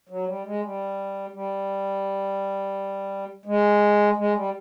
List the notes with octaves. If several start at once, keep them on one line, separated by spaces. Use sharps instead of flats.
F#3
G3
G#3
G3
G3
G#3
G#3
G3